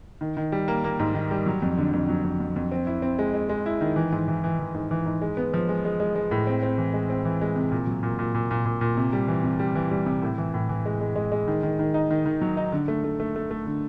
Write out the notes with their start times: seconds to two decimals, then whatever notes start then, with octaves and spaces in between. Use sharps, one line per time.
0.21 D#3
0.37 D#3
0.52 G3
0.68 A#3
0.84 A#3
0.99 G#2
1.15 D#3
1.31 G3
1.46 F#3
1.62 F2
1.78 D3
1.93 F2
2.09 F#3
2.24 F2
2.40 F2
2.56 F2
2.72 C4
2.87 E4
3.02 C4
3.19 G#3
3.34 G#3
3.49 G#3
3.66 E4
3.81 D#3
3.96 E3
4.12 G#2
4.28 E3
4.44 E3
4.59 E3
4.74 G#2
4.91 E3
5.06 G#2
5.21 G#3
5.37 B3
5.54 F3
5.69 G#3
5.85 G#3
6.00 G#3
6.16 G#3
6.31 A2
6.47 C4
6.63 C4
6.78 E3
6.94 G#3
7.10 C4
7.25 E3
7.41 G#3
7.56 C3
7.72 A#2
7.87 F#3
8.03 A#2
8.19 A#2
8.35 A#2
8.51 A#2
8.66 A#2
8.81 A#2
8.97 C3
9.13 G3
9.28 E3
9.44 C3
9.60 G3
9.75 E3
9.91 G3
10.06 C3
10.22 A2
10.38 E3
10.54 A2
10.69 E3
10.86 G#3
11.01 G#3
11.16 G#3
11.32 G#3
11.48 D#3
11.63 D#3
11.79 D#3
11.94 D#4
12.11 D#3
12.26 D#3
12.41 F#3
12.57 D#4
12.72 D3
12.88 A3
13.04 A3
13.20 A3
13.36 A3
13.51 A3
13.66 D3